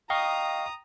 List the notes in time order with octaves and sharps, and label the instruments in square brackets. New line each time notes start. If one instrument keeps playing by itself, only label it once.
[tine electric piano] D#5 F5 C#6 [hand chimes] G5 [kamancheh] A#5 D#6